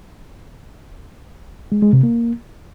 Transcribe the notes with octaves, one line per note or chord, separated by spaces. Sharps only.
G#3
G#3
C3
A#3